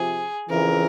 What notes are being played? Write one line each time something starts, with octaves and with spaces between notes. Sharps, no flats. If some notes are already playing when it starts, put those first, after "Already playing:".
Already playing: C3 F3 G#4
F2 C#3 E3 A#4